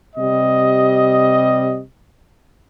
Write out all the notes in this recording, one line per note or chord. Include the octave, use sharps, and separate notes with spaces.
C3 G3 D#5